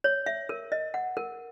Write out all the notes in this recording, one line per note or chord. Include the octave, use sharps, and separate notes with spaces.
C#5
E5
A#4
D#5
F#5
A#4